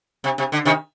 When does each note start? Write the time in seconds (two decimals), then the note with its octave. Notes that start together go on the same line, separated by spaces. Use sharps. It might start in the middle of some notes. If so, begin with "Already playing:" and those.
0.24 C3
0.38 C3
0.52 D3
0.65 C3 D#3